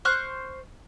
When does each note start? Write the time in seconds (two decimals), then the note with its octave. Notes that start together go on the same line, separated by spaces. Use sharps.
0.05 C5 C#6 F6 F#6